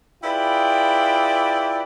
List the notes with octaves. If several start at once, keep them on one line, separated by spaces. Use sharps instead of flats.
E4 F4 G#4 B4 D5 G5